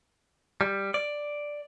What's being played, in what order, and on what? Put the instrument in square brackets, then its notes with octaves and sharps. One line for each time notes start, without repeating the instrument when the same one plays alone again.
[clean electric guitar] G3
D5